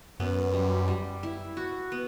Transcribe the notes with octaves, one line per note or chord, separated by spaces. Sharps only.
F#2 B3
G3
G3
E4
F#4
B3